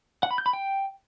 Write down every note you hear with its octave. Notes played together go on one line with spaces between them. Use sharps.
F#5
B5
G6
B5
G5